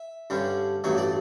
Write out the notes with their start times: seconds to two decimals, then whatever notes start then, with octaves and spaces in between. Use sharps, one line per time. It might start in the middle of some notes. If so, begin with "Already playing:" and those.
Already playing: E5
0.30 G2 D3 G3 C#4
0.84 A1 G2 F#3 A3 C#5
0.98 D5